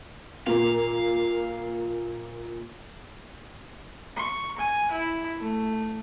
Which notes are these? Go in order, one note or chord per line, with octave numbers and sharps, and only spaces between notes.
A#2 A#3 F5
C#6
G#5
E4
A3